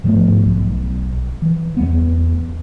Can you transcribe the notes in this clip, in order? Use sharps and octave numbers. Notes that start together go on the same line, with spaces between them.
G#2 F3 A3 B3
B1
E3
E2 G#3 B3